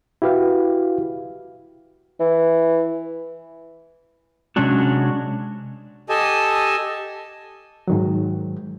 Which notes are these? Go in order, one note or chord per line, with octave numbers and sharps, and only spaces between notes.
E4 F#4 G4 B4 F5
E3
C3 F#3 G#3 C#4 D4 F#4
G4 A4 D#5 G#5 A5
G#2 D#3 F#3